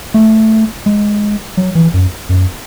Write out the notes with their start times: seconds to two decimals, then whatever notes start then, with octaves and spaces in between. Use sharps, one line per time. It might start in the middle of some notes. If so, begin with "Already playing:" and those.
0.14 A3
0.86 G#3
1.57 F#3
1.75 E3
1.94 F#2
2.29 F#2